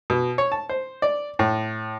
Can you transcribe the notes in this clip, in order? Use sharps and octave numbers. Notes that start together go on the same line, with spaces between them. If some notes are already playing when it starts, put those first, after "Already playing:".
B2
C#5
A5
C5
D5
A2